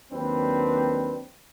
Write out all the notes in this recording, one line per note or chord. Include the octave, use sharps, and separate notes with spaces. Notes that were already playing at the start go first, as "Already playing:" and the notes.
D#2 F#3 C4 D4 B4